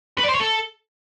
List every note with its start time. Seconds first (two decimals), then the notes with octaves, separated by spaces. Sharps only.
0.18 B4
0.24 D5
0.29 C5
0.34 C#5
0.40 A4